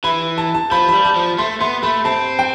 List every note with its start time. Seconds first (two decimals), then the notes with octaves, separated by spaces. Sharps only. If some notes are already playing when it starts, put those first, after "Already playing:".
0.04 E3 B5
0.38 A5
0.54 A5
0.71 F3 B5
0.88 B5
0.93 G3
1.05 A5
1.16 F3
1.38 A3 C6
1.60 B3 C6
1.83 A3 B5
2.05 C4 A5
2.39 G5